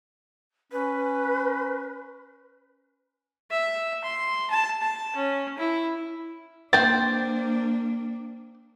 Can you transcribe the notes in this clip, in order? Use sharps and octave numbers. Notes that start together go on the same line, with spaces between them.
C#4 B4
E5
C6
A5
A5
C#4
E4
A#3 C4 D4 C5 A6